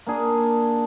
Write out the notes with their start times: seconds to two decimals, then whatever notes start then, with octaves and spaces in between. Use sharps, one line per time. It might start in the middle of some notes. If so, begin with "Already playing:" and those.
0.07 A#3 D4 G#4